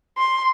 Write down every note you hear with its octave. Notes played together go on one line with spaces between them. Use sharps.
C6